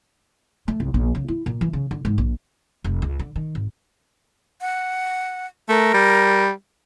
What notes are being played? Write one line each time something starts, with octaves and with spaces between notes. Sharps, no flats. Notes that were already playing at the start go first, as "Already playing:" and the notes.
A3
C2
A#1
C#3
E4
A#2
E3
C#3
D3
G#2
A#1
F1
C#2
D3
D#3
G#1
F#5
A3 A#4
G3